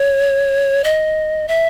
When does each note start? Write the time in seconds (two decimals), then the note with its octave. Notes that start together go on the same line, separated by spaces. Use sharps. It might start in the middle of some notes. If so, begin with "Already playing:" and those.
Already playing: C#5
0.84 D#5
1.48 E5